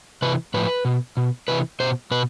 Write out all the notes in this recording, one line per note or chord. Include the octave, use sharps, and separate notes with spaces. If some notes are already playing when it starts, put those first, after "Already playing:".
C3 E3 B4
A2 F3 B4
B2
B2
C3 E3 B4
B2 C5
B2 B4